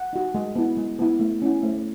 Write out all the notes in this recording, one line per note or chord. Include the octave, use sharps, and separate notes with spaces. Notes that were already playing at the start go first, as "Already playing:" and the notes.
Already playing: F#5
D#4 F#4
G#3
B3 E4
G#3
B3 E4
A3
C#4 E4
A3